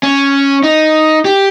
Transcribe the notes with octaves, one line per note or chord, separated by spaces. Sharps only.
C#4
D#4
G4